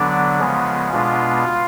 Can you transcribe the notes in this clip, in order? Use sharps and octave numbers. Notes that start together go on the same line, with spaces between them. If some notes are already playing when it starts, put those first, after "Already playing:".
Already playing: D3 F#3 B3 D4 D5
C#3 F3 G#3 B3
B2 G#3 B3 D4 F4